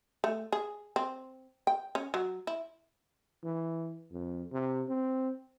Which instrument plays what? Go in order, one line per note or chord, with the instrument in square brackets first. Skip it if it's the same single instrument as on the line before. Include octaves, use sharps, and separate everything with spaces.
[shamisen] A3
G#4
C4
G5
C#4
F#3
E4
[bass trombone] E3
F2
C3
C4